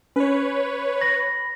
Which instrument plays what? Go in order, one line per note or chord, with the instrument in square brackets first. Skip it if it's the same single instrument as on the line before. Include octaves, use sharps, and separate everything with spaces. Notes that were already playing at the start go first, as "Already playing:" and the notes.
[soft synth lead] C#4 [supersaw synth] B4 C#5
[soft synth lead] B5 [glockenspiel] A#6